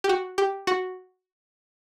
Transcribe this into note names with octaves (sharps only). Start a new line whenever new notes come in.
G4
F#4
G4
F#4